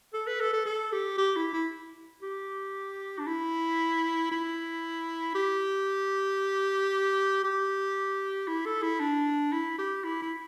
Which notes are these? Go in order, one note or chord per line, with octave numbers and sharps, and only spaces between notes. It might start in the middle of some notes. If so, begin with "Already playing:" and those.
A4
B4
A4
A4
A4
G4
G4
E4
E4
G4
D4
E4
E4
G4
G4
E4
A4
E4
D4
E4
G4
E4
E4